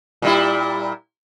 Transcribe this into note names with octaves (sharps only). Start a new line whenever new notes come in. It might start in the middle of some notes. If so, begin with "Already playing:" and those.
A#2 G3 E4